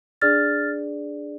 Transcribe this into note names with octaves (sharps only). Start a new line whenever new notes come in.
D4 G#4 D5 F6 A6